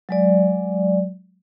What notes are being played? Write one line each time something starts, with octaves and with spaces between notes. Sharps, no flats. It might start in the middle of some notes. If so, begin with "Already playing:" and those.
F#3 G#3 D5